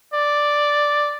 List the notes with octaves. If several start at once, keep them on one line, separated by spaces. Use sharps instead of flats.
D5